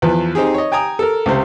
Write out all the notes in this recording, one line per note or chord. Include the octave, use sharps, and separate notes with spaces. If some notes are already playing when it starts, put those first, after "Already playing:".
E2 F3 B4
C4 D#4 G4 G#4
C#5 D#5
G5 G#5 A#5 D#6
A4 A#4
C#2 C3 C5